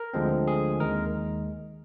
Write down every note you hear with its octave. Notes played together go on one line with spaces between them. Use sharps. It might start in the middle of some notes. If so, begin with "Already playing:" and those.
Already playing: A#4
D2 D3 F3 G#3 C4
G#4
D#2 D#3 G#3 A#4